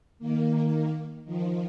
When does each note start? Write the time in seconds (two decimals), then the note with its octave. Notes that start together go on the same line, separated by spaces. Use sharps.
0.19 D#3 A#3
1.25 D#3 F3